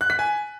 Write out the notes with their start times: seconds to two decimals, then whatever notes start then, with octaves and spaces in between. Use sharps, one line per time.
0.01 F#6
0.10 B6
0.19 G#5